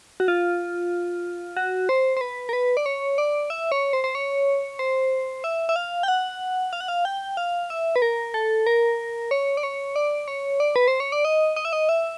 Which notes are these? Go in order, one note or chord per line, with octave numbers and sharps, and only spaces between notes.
F#4
F4
F#4
C5
C5
B4
A#4
B4
D5
C#5
D5
E5
C#5
C5
C5
C#5
C5
E5
E5
F5
G5
F#5
F5
F#5
F5
G5
F5
E5
B4
A#4
A4
A#4
C#5
D5
C#5
D5
C#5
D5
B4
C5
C#5
D5
D#5
D#5
E5
D#5
E5